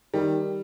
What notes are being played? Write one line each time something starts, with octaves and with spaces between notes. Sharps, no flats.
D#3 G3